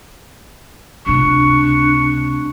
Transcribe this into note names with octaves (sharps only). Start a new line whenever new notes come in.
C#2 C3 D4 C#6